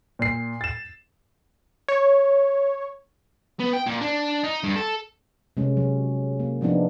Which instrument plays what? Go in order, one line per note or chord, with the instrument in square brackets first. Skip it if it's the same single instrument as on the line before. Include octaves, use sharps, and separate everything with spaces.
[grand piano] A#2 C7
A6 E7
[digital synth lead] C#5
[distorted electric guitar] B3
G5
A#2
D4
D#4
G2
A4
[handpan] C3 G#3 C#4
F#3
A#3
F3 B3 C4 D4 D#4